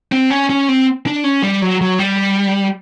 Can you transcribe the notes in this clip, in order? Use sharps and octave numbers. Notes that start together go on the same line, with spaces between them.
C4
C#4
C#4
C4
D4
C#4
G3
F#3
F#3
G3